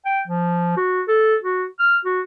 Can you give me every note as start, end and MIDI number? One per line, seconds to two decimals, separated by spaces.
0.06 0.20 79
0.28 0.76 53
0.77 1.02 66
1.08 1.35 69
1.43 1.65 66
1.79 1.97 89
2.05 2.21 66